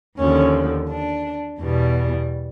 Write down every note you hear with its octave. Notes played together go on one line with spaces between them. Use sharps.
D#2 D3 F3 C#4
D4
E2 B2 G3